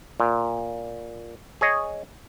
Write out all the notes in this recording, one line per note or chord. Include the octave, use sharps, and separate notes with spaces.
A#2
G#4 C#5 D#5